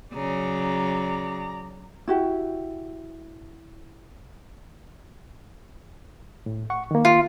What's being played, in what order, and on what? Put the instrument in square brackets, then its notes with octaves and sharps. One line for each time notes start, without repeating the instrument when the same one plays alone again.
[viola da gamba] C#3 F#3 [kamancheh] D5 A#5
[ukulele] E4 F#4 G4
[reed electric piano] A2
F#5 C#6
D#3 A#3
[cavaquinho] F4